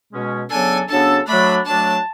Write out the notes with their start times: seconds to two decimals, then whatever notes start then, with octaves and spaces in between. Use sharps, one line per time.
0.12 B2 G#3 C#4
0.50 C#3 F#3 B3 D4 A4 G#5
0.89 C#3 F#3 B3 D4 A4 A5
1.27 F#3 A3 D4 B5
1.65 F#3 A3 D4 A5